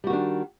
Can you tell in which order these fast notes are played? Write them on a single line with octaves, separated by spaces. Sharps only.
G3 F#4 D#3 D4